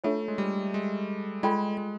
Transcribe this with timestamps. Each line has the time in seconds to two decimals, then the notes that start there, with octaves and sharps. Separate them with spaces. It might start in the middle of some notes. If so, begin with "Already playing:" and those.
0.04 A3 D4 F4 A4 C#5 E5
0.28 G#3
0.38 G3
0.74 G#3
1.43 G#3 F4 A4 D5 G5 B5
1.78 G#3